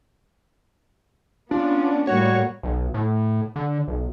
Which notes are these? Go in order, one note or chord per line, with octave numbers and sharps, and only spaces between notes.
B3 C#4 D4 F4
A2 G3 A#3 F#4 C#5
B1
A2
D3
B1